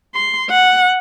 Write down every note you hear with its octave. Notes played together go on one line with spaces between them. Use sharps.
C6
F#5